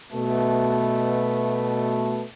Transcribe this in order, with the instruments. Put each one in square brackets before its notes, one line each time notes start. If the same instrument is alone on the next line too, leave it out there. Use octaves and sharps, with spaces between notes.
[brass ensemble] B2 A3